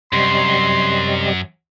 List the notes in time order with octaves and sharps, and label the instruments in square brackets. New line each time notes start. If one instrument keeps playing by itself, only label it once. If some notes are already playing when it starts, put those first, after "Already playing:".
[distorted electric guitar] F#2 [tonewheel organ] C3 G3 D#5 [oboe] C6